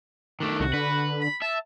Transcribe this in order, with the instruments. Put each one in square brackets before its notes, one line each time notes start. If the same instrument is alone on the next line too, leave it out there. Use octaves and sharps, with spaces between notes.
[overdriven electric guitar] D#3 A3 [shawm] D4
[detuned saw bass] C2 [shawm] F#4
[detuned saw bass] D3 [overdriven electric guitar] B4
[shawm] B5
[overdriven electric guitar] E5 [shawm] A5